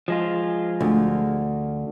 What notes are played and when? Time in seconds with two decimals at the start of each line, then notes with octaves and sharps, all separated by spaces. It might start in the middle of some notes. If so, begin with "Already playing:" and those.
0.08 F3 G#3 F4
0.81 D2